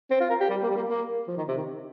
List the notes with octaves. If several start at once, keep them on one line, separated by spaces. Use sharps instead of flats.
C4
F4
A#4
G4
G3
A#3
G3
A#3
A#3
F3
D#3
C3
D#3